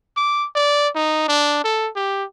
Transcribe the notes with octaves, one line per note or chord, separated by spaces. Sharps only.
D6
D5
D#4
D4
A4
G4